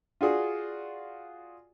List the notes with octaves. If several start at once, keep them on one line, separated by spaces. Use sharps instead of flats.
F4 F#4 G#4 D5